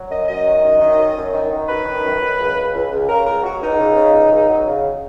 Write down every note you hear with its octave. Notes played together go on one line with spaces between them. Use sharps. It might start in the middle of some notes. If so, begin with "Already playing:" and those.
Already playing: F#3
F#2 D#5
F#2 D#5
D#3
F#2
D#3
F#2
F#2
D#3
D#3
F#2 B4
D#3
F#2
F#2
C#2
C#2
C#2
C#2
C#3 A#4
C#2 A#4
F#3 F#4
C#2 D#4
C#2
C#3
C#2
C#2
F#3
C#3